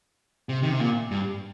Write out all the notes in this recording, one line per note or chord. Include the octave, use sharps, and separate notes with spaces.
C3
D#3
C3
A#2
G2